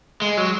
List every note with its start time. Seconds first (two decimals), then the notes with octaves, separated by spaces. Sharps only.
0.22 G#3
0.37 F#3